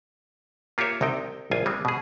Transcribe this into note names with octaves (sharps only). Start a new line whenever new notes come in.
A#3 F4 G4 A#4 C#5 E5
C2 C3 D#4 G5
A#1 F4 G#5
G3 G#3 C4
B2 G#4